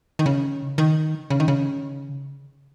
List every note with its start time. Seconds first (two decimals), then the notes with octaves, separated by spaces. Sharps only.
0.19 D#3
0.26 C#3
0.78 D#3
1.30 C#3
1.40 D#3
1.48 C#3